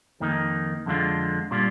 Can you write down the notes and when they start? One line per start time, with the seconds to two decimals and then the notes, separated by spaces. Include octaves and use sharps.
0.20 F2 D#3 A#3 D#4
0.86 F2 D3 G#3 D4 F4
1.51 A#2 G3 D4 F4